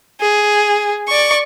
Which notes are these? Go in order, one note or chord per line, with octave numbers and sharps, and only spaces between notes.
G#4
D5 C#6